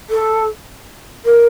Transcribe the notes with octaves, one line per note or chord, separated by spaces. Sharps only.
A4
A#4